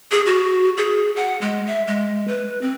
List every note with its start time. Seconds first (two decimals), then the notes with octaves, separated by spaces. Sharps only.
0.11 G#4
0.26 F#4
0.77 G#4
1.16 F#5
1.41 G#3
1.67 E5
1.87 G#3
2.28 B4
2.61 C4